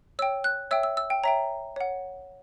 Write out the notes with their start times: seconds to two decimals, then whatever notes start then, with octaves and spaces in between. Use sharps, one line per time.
0.19 C#5 G5 E6
0.44 F#6
0.71 C#5 E5 G5 E6
0.83 E6
0.97 E6
1.10 G5
1.24 C#5 E5 G5 A#5
1.76 C#5 F#5